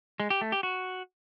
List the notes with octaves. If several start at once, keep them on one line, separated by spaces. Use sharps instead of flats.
G#3
G4
A3
G4
F#4